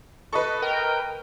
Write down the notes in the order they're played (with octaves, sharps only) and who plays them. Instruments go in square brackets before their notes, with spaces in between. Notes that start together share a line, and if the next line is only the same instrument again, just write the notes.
[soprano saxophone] A4 [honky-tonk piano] B4 D#5 C#6
[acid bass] A#4 [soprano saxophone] G5